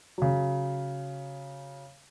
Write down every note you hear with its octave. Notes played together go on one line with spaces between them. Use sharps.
C#3 F#3